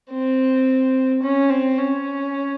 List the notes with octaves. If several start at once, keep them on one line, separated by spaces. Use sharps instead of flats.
C4
C#4
C4
C#4